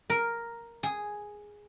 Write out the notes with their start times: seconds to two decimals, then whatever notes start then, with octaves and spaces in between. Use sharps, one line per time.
0.10 A#4
0.83 G#4